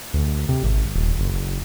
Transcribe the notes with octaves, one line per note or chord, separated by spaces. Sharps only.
D2
C3
G#1
D#1
F#1